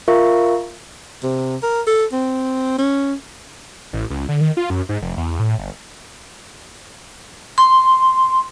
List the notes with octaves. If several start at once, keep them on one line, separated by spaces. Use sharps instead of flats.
F4 A#4 E5 F5 C#6
C3
A#4
A4
C4
C#4
A1
C#2
D3
D#3
F4
F#2
G#2
F1
E2
A2
G1
C6